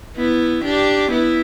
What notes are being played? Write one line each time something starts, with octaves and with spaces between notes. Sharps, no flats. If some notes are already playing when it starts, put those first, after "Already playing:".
B3 E4
D4 G4
B3 E4